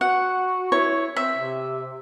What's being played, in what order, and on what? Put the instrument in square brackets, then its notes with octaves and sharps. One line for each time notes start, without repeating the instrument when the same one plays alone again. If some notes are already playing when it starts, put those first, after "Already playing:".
[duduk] F#4 [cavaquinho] F#5
[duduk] E4 [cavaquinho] C#5
[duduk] C4 [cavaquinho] E5
[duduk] C3